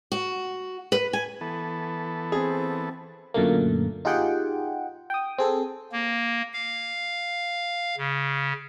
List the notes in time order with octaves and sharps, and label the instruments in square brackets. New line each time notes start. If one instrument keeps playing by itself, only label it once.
[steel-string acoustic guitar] F#4
B4
G#5
[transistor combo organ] E3 B3 A4
[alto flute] C4 [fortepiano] G#4
[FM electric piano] F#2 A#2 D3 A3 A#3
D#4 F4 G4 G#4 F#5 G5
G5 D#6
C4 G#4 A4
[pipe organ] A#3
F5
C#3